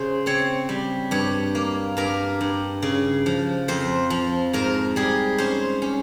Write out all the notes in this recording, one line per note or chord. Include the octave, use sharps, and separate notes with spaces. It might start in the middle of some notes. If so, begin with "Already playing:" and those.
Already playing: C#3 G#4 C5
C4 C#5
G3
G2 C#5
A#3
G2 A#4
G2
C#3
F3
F2 C5
F3
G#2 A#4
G3 G#4
C#4 C5
C#4